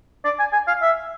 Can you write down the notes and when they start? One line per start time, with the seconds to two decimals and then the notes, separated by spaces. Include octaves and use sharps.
0.25 D5
0.39 G#5
0.53 G#5
0.67 F5
0.82 E5